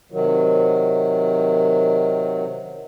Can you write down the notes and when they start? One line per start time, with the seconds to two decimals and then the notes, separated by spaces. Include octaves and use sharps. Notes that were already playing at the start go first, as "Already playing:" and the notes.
0.12 C3 D#3 F#3